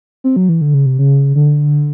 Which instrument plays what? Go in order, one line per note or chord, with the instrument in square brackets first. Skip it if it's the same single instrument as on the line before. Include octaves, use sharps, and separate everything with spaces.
[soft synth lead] C4
F#3
E3
D3
C#3
C3
C#3
D3